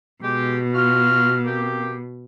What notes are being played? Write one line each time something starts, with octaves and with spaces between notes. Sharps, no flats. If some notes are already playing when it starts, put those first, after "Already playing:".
B2 G#3 G4
F4 F#4 F6
A#3 C4 G4